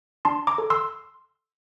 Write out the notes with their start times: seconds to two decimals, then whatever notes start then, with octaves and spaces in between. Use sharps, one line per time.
0.25 D4 A5 C6
0.47 A#5 D6
0.58 A4
0.70 C6 E6